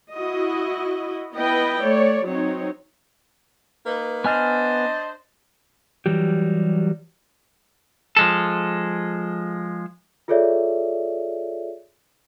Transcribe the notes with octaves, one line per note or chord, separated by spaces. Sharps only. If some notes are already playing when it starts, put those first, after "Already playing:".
E4 F#4 D#5
B3 E4 B4 D#5 G5
A3 C#5 D5
F#3 C4 D#4 C#5
A#3 D#4 B4
B3 D4 C5 D#5 G#5 F6
E3 F#3 G3 G4
F3 G#3 A4
F4 G#4 A4 C#5 D5 E5